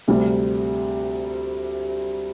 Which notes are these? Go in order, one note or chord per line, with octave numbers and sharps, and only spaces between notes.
D2 C3 G3